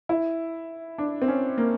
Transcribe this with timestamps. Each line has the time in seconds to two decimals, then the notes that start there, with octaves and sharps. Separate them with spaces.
0.09 E4
0.98 D4
1.22 C4
1.28 C#4
1.58 A#3